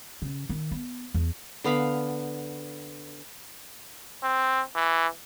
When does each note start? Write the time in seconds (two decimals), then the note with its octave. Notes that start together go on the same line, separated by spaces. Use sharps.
0.22 C#3
0.49 D#3
0.71 B3
1.14 E2
1.64 D3 B3 F5 B5
4.23 C4
4.75 E3